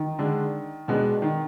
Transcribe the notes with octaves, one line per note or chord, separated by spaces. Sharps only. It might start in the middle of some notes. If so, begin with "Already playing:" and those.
Already playing: D#3
D3 G#3 D4
B2 G#3 B3 D4
D#3